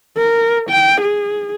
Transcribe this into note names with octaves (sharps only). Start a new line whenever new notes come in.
A#4
G5
G#4